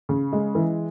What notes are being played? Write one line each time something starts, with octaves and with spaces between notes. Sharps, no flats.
C#3
G#3
E3